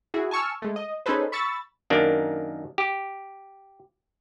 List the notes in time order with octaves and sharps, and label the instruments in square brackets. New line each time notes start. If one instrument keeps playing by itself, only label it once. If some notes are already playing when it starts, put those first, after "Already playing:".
[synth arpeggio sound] E4 F#4 G#4
G#5 A5 C#6 E6 F6
G#3 A3
D#5
C#4 D#4 G#4 A4 B4 C5
B5 C#6 E6 A6
[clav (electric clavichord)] F#2 D#3 A#3 D4
G4